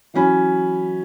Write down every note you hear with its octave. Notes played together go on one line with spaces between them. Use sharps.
E3 F#3 C#4 B5